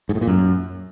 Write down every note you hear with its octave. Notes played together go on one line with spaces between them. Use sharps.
G#2
A2
A#2
F#2